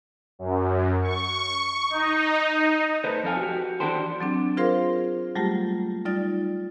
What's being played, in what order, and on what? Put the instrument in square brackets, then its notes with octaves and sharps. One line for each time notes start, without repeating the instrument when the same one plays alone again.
[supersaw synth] F#2
C#6
D#4
[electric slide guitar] A3 B4 C5
F2 A4 F5 G#5
F#4 G4
E3 D4 F#4 G4 A4 C5
[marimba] F#3 C4 D4
F4 G#4 A#4 C5 F5 C6
F#3 G3 A3 A#3 F4 G4
G3 D#4 F4 D5 A6